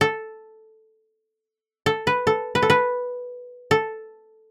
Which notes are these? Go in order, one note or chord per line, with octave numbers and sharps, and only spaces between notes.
A4
A4
B4
A4
B4
A4
B4
A4